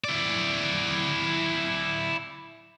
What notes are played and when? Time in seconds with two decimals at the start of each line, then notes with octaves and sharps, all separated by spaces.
0.04 E4 D5